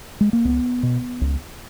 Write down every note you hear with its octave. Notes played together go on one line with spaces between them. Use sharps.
G#3
A#3
C#2 B3
B2
C#2